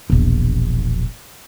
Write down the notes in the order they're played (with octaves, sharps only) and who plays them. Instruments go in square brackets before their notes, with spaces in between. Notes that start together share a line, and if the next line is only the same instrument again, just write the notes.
[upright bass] E1 A#1